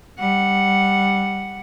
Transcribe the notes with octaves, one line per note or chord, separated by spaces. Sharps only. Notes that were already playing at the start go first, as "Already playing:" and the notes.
G3 F#5